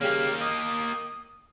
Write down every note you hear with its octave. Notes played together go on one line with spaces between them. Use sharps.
C#3 G3 A#3 G4 F6
D#5 D#6